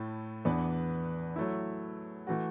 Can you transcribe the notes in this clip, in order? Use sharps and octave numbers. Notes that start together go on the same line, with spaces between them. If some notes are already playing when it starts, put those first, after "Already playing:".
Already playing: A2 A3 E4
E2 E3 B3 D4 B4
F#3 A3 E4
E3 A3 F#4